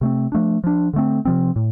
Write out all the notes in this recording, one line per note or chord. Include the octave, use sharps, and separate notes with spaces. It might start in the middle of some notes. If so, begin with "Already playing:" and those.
C3 A3 C4
F3 A3 D4
F3 D4
D3 A3 C4
C3 F3 C4
A2